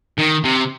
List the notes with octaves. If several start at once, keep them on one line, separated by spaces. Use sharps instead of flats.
D#3
C3